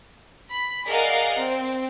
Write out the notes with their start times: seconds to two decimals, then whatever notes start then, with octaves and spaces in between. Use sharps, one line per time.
0.51 B5
0.86 G#4 A#4 D5 D#5 F5 F#5
1.37 C4